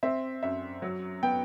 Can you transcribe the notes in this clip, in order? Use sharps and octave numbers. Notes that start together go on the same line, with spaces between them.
C4 E5
F#2 E5
F#3
B3 G5